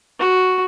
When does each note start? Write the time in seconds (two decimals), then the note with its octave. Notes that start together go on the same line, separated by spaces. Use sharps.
0.19 F#4